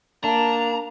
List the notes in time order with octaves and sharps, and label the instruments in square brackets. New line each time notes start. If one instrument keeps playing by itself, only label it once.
[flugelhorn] A#3 [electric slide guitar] D4 [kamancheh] A5 [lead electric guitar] A#5